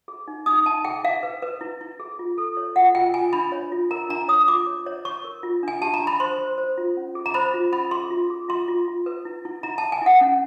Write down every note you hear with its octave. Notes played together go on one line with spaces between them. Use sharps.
G#4
D#4
D#4 D#6
D#4 A5
G#4 G5
E4 F5
B4
B4
E4
E4
G#4
F4
A4
C#5
F4 F#5
F4 G5
F4 G#5
D4 B5
C#5
F4
A#4 A#5
D4 A#5
C#5 D#6
F4 D6
C#5
C#5
C#5 C#6
A#4
F4
D4 G#5
G4 A5
A#5
D4
B5
C5 C6
C5
C5
F4
C#4
G#4
A#5
C5 B5
F4
C#4 B5
G#4 C6
F4
G#4
F4 C6
F4
F4
B4
E4
E4
E4 A#5
A5
E4
G#5
E4 F#5
C#4